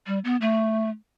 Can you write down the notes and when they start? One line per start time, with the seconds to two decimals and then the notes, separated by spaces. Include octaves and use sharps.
0.07 G3
0.24 B3
0.41 A3